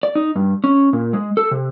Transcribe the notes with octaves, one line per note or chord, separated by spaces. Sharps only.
D5
D#4
G2
C#4
A#2
G#3
A4
C3